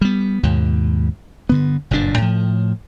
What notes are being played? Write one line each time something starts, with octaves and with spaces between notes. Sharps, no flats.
G3 B3
D#2 G#2 B2
G2 D3 B3
F#1 G2 A#2 D4
A2 F3